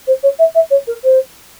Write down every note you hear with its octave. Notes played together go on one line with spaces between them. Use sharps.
C5
C#5
E5
E5
C#5
A#4
C5